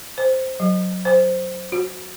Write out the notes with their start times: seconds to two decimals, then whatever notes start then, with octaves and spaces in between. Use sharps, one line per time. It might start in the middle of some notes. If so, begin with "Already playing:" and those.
0.18 C5
0.60 F#3
1.05 C5
1.72 F#4